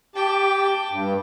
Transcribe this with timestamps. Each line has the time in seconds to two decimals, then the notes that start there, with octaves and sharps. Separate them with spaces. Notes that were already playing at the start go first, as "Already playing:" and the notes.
0.15 G4 G5 A5
0.92 G2